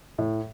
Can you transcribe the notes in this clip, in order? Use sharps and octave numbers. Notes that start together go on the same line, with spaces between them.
A2